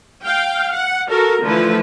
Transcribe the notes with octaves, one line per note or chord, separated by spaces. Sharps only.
F5 G5
F#5
F#4 A4 A#4
D3 E3 F3 A3 E4 B4